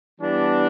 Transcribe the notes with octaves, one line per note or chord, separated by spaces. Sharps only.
E3 G3 B3 D4